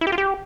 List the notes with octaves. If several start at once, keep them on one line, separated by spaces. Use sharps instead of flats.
E4
G4
F4
G4